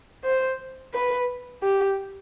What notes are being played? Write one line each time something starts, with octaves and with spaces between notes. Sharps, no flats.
C5
B4
G4